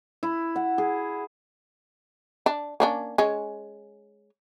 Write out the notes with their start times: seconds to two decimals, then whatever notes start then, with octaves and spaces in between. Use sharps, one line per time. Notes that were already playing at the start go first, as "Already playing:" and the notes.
0.23 E4
0.56 F#5
0.78 G#4
2.46 D4
2.80 A#3 C#4 D4
3.18 G#3 C#4